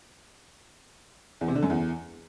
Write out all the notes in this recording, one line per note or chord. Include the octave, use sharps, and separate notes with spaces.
E2
C3
D3
F#2
E2